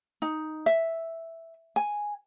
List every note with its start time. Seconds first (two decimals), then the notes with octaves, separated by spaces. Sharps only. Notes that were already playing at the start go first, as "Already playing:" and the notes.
0.22 D#4
0.66 E5
1.76 G#5